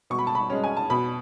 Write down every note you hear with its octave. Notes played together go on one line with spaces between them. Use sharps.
B2 C#6
B5
A5
B5
G#3 C#4
G#5
A5
B2 B5